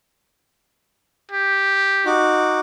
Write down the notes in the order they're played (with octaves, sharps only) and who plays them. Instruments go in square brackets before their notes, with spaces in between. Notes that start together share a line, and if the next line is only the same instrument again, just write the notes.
[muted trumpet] G4
[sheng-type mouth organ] D#4 F#4 D6